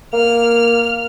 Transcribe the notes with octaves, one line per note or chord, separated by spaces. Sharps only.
A#3 F6